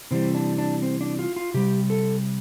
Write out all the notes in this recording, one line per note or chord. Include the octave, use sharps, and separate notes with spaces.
C3 E3 G3 C4
D4
D4
C4
D4
F4
F4
C3 G3 G4
A4